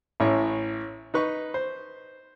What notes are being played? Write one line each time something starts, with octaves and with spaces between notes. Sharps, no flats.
A1 A2 C#5
D#4 B4 C#6
C5